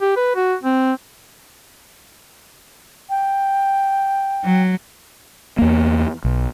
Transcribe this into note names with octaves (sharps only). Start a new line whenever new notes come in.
G4
B4
F#4
C4
G5
F#3
E2 A#3
B1